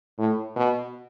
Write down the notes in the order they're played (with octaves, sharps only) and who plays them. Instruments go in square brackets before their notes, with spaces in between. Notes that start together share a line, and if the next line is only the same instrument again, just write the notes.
[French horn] A2
B2